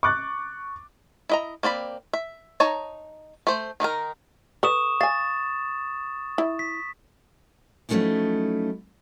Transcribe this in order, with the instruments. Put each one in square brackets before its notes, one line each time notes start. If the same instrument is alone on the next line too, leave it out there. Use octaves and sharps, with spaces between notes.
[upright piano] C#6 D6 F#6 A6
[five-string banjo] E4 D#5 A#5
A#3 C4 D5 B5
E5
D#4 C#5 A5 A#5
A3 C5
D#3 D#4 F#4 A#4
[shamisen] A4 B4 [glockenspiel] C#6 D#6 E7
[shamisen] F5 G#5 [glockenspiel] A6
[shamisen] E4
[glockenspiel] B6
[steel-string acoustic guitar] F3 F#3 A3 C#4 D#4 E4